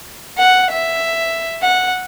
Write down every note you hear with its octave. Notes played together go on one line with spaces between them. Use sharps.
F#5
E5
F#5